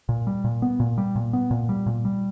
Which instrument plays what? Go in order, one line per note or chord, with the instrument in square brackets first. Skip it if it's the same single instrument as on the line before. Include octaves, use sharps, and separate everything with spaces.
[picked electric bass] A#2
G3
A#2
B3
A#2
G3
A#2
B3
A#2
G3
A#2
G3